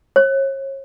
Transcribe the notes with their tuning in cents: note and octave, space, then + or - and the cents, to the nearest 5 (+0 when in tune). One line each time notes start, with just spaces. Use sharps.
C#5 -35